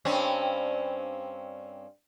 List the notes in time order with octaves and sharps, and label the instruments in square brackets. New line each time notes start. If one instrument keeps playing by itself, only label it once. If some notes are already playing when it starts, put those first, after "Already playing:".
[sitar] G2 C4 C#4